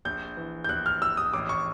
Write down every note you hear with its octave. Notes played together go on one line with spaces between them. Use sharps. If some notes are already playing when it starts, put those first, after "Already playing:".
A#1 G6
E3
G6
A#1 F#6
F6
A#1 E6
D#6
A1 D6
C#6